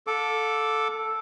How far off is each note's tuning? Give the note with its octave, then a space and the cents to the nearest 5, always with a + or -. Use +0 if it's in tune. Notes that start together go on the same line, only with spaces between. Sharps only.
A4 +0 F5 +45 D6 +0